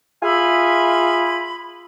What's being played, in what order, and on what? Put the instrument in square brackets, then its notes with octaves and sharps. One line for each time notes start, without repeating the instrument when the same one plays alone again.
[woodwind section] F4 G#4 E5 G#5 B5